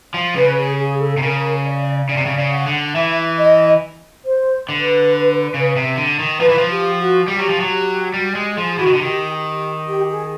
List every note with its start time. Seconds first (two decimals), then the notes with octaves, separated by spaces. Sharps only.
0.14 F3
0.36 C#3 B4
0.58 G#4
0.79 G#4
1.00 A4
1.17 C3
1.22 C#3 A#4
1.65 D5
2.08 C#3 D5
2.17 C3
2.26 C#3
2.38 C#3
2.52 F#5
2.66 D3
2.95 E3 E5
3.39 D#5
4.25 C5
4.68 D3 B4
5.54 C#3
5.76 C3
5.97 D3
6.20 D#3
6.40 F3 B4
6.49 E3
6.58 F3
6.70 G4
6.99 F#4
7.27 G3 G4
7.38 F#3
7.50 F3
7.60 F#3
7.70 G4
8.14 G3 F#4
8.35 G#3 G4
8.57 F3 G#4
8.78 E3 F#4
8.86 D#3
8.94 D3
9.00 D#3 G4
9.43 G4
9.86 G4
10.09 G#4